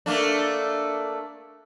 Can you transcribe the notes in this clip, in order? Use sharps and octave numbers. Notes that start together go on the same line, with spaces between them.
A3 A#3 D4